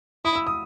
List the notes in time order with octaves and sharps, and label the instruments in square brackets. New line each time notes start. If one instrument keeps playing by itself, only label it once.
[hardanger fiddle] E4 [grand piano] D#6
[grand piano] E6
D#6